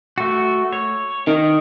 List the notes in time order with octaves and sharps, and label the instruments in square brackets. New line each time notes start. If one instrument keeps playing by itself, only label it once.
[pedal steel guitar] A3 F#4
C#5
[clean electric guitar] D#3